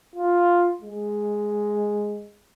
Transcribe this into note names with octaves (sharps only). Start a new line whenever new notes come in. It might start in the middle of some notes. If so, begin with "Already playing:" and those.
F4
G#3